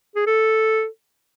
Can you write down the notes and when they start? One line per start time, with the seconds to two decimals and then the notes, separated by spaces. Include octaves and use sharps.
0.15 G#4
0.26 A4